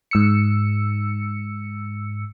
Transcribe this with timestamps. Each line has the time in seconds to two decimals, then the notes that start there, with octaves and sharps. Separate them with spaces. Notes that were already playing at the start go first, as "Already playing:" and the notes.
0.11 G#2 E6 C#7